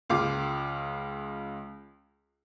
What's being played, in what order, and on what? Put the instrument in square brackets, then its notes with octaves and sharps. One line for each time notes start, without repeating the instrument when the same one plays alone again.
[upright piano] C#2 F4 F5 D6